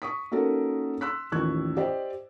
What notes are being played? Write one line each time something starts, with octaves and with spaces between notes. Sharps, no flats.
C#6 D#6 B6
A#3 C#4 D#4 F#4 A4 A#4
C6 E6 F#6 B6
A1 D#2 F3 C#6 F#6 G#6
G4 C5 D5 D#5 G5